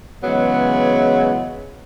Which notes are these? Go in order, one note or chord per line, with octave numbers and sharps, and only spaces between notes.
C#3 E3 F#3 G#3 B3